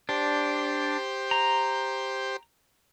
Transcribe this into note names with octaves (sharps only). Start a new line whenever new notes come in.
D4 G4 C5
A#5